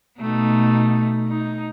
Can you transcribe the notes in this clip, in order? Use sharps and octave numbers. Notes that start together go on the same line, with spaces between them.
B2 A3 D#4
D#4